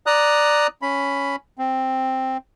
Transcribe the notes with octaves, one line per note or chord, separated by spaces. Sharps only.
D5 A#5 D#6 F#6
C#4 B5
C4